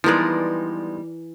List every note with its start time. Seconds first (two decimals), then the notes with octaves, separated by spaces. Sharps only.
0.04 E3 F3 G3 G#3 B3 D#4 A#4 D5